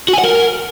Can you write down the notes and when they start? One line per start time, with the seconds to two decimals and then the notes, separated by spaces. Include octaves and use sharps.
0.08 F#4
0.13 G#5
0.19 F#5
0.24 A#4